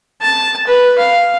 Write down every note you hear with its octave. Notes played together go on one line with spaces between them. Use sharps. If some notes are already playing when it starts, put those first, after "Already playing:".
A5
B4
F5